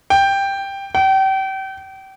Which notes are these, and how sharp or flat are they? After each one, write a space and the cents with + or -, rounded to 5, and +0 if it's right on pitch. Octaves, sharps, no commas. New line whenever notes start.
G5 +5
G5 -35